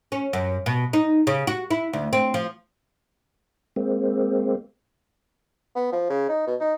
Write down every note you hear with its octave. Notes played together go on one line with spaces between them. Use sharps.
C#4
F#2
B2
D#4
C#3
F#4
E4
D2
C4
F3
G#3 A#3 C4
B3
F3
C#3
D#4
B2
D#4